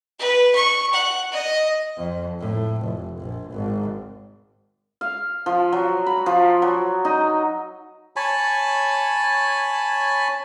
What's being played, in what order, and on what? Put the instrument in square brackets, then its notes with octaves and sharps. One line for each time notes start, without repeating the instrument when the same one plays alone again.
[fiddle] B4
C#6
F#5
D#5
[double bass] F2
A2
F1
A#1
G#1
[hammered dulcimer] F5
F3
F#3
B5
F3
F#3
D#4
[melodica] C#5 G#5 A5 B5